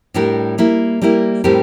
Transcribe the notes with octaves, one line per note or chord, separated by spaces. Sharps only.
A2 G3 D4 G4 A#4
G3 A#3 E4 A#4
G3 A#3 E4 A#4
A2 G3 C4 G4 A#4